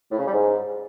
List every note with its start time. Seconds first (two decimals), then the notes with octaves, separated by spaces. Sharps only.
0.11 A2
0.19 C#3
0.26 G3
0.33 G#2